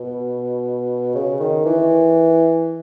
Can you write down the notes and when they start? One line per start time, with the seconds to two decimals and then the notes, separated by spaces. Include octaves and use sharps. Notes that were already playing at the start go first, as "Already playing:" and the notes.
Already playing: B2
1.15 C#3
1.40 D#3
1.65 E3